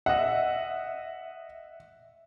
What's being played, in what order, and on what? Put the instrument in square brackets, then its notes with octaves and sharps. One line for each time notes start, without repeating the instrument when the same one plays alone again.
[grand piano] D#5 F#5 [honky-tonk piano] E5